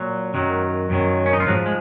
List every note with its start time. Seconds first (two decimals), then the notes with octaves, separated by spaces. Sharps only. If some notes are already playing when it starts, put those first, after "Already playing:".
Already playing: A#2 F#3
0.34 F#2 D#3 F#3
0.90 F#2 D#3 F#3
1.26 C#4
1.33 D#4
1.40 F4
1.46 G#2 F3 F#3 F#4
1.66 G#3